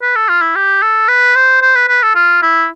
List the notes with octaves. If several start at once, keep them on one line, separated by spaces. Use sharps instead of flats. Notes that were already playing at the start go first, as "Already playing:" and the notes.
B4
A4
F4
E4
G4
A4
B4
C5
C5
B4
B4
A4
F4
E4